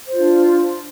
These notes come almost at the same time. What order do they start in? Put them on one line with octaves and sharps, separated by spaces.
C5 F4 D4